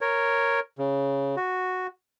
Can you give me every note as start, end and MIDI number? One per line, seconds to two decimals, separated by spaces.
0.01 0.60 70
0.01 0.60 73
0.78 1.36 49
1.37 1.87 66